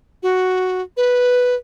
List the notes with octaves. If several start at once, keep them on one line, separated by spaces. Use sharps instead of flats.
F#4
B4